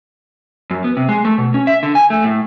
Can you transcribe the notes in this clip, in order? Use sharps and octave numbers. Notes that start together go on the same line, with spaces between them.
F#2
B3
C3
G#3
A3
B2
C#4
E5
D3
G#5
A3
A2